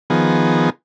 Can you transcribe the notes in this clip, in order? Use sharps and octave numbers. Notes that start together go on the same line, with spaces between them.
D#3 F3 B3 G#4